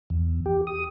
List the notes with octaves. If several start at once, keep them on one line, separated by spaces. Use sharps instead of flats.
E2
G4
D#6